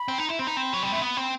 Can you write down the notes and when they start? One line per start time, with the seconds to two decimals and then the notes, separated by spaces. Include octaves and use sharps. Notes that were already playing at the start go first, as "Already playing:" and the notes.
Already playing: B5
0.08 C4
0.18 D#4
0.29 E4
0.39 C4 B5
0.47 D#4
0.57 C4
0.74 F#3
0.83 G3
0.92 A3
1.02 B3
1.17 C4